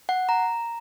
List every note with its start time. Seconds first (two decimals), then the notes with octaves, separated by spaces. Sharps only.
0.09 F#5
0.29 A#5